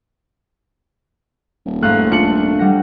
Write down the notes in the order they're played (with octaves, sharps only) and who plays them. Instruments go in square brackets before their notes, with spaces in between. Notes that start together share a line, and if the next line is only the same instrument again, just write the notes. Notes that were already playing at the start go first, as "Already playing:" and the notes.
[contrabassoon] D#1
[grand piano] G#2 F5 F#6 [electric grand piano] A3
[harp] D4 F4 [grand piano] C#7 F#7
[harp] G3 F#5 A#6